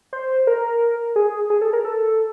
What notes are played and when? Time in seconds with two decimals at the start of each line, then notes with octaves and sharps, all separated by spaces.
0.13 C5
0.47 A#4
1.16 G#4
1.50 G#4
1.61 A4
1.73 A#4
1.84 A4